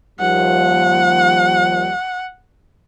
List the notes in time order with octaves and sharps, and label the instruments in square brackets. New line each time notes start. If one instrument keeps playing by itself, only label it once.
[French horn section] D#2 F3 G3 [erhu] F#5